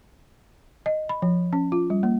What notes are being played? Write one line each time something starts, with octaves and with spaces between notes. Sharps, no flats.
D#5
B5
F3
C#4
F4
G3
A#3